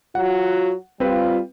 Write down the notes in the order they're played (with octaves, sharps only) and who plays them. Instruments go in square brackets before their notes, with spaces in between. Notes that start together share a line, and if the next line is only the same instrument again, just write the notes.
[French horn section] F#3 F4 F#4 [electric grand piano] F#5
[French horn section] G3 F4 [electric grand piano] C4 B4